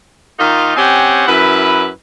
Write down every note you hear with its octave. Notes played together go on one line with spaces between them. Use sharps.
D#3 A#3 D#4 F4
C4 C#4 G4 F#5 G#5
F#2 E4 B4